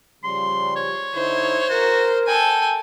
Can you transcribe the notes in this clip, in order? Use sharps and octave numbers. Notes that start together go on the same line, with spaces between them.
C#3 F3 G3 C6
C#5
D3 D#4 E4 C5
F#4 A#4
A4 G5 G#5